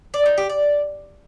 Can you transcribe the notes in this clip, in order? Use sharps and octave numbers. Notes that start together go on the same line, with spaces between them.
D5
D#4
G4
D5